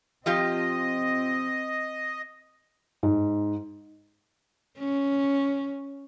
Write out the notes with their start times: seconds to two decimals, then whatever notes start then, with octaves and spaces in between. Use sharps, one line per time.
0.26 F3 C4 F4 G4 D#5
3.03 G#2
4.78 C#4